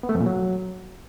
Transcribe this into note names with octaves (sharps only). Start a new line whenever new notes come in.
B3
A3
F2
A#2
F#3